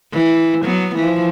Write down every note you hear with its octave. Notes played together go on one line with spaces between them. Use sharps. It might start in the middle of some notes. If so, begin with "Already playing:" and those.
E3
F#3 B3
E3 F3